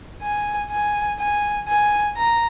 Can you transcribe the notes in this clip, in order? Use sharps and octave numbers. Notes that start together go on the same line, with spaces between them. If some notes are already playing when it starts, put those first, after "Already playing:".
G#5
G#5
G#5
G#5
A#5